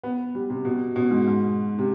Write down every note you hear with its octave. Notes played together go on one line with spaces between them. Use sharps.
B3
G3
C3
B2
B2
G#2
G#2
C3